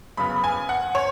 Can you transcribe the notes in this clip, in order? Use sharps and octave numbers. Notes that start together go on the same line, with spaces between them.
F#2 C#3 B3 B5
G#5
F#5
C#5